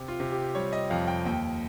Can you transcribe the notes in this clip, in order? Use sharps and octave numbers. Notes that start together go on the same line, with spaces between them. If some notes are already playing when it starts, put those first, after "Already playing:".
Already playing: C3
F4
C3
G4
G3 C#5
D#5
F2 F5
G5
D#2 G5